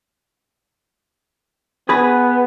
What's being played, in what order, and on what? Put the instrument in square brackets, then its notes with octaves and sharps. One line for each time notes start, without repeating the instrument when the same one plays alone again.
[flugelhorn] B3 [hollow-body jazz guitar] G#4 B4